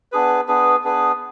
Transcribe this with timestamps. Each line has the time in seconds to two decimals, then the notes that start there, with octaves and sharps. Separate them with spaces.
0.12 B3 D4 G#4 B4
0.48 B3 D4 G#4 B4
0.84 B3 D4 G#4 B4